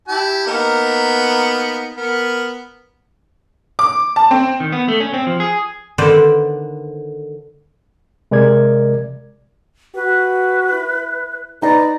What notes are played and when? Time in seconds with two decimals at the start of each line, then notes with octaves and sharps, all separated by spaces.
0.08 E4 G4 A5
0.47 A#3 B3 D#4
1.97 B3 A#4
3.79 D6
4.16 A5
4.31 C4
4.60 D#3
4.72 B3
4.88 A3
5.00 C#4
5.14 C4
5.27 F3
5.40 G#4
5.98 D3 D#3 A4 B4 C5 D5
8.31 C3 G#3 A#4 D5 G#6
9.95 F#4 B4
10.72 E4
11.62 D#4 B4 D5 A#5